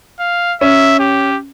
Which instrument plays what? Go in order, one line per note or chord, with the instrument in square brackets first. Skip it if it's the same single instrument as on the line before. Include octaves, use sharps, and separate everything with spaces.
[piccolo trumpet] F5
[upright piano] C#4 [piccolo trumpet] E5
[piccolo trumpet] G4